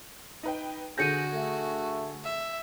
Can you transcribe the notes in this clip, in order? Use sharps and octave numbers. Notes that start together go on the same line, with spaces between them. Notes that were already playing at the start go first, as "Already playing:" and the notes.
D#4 B4 G5
D3 F#4 G#4 G6 A#6 C#7 D#7
A3
E5